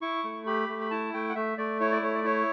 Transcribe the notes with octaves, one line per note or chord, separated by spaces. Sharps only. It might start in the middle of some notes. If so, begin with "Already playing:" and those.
E4 C#6
A3
G4 B5
A3
B5
E4 A5
A3 G5
F#5
A3 E5
A3 D5
E4 C#5
D5
A3 C#5
D5
E4 C#5